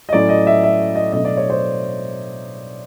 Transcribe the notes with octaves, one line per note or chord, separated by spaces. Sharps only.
D#5
A2 F#3 A3 C#4 D5
D#5
E5
E5
D#5
B2 F#3 A3 D4 D#5
D5
C#5
C5